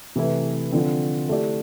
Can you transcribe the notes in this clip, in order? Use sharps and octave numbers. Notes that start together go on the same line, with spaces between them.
C3 E3 A3 E4 B4
D3 F3 C4 F4
A3 E4 G4 D5